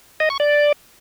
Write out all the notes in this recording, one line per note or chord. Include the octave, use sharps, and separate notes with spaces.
D#5
C#6
D5